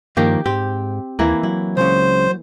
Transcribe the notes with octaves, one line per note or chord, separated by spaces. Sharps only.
G2 D#3 F3 A#3 G4
G#2 C4 G4
D#2 E3 A#3 E4
F#3 E4
C#2 C#3 C5